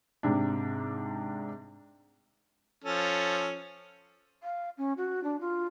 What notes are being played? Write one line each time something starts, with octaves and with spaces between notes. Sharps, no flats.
G#2 C3 D4
F3 C#4 A4
F5
C#4
F#4
D4
F4